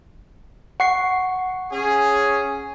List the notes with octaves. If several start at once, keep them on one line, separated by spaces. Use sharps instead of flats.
F#5 C#6 C7
C#4 G#4